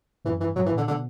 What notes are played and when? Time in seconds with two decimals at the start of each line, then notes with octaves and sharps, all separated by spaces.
0.25 F#2 E3
0.40 G2 E3
0.56 G2 F#3
0.66 E3
0.71 A#2
0.77 D3
0.87 B2 D3